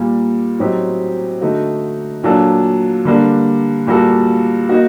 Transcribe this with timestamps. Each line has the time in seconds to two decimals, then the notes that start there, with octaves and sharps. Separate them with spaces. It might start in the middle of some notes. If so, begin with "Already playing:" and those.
Already playing: A#2 G3 A#3
0.59 A2 F#3 C4 D#4 G4
1.41 D3 A3 D#4 F#4
2.23 A#2 F#3 A#3 D4 A4
3.05 D3 G3 A#3 D4
3.87 A#2 G3 A#3 F#4 A4
4.69 A#3 D#4 F#4